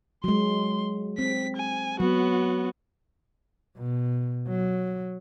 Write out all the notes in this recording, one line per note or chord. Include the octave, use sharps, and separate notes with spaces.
F#3 G#3 C6
C4 B6
G#5
F#3 B3 F#4
B2
F#3